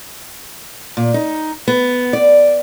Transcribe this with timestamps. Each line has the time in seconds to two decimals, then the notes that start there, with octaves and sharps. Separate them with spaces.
0.97 A#2
1.14 D#4
1.68 B3
2.13 D5